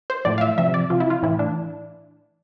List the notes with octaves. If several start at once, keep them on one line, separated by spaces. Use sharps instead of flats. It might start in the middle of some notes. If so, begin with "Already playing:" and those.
C5
A2 F3 D5
F5
E5
C3 F3 E5
D5
C3 F3 F4
E4
F4
A2 E3 E4
D4